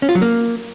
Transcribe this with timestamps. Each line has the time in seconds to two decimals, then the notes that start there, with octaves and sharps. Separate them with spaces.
0.02 C#4
0.09 F4
0.15 F#3
0.22 A#3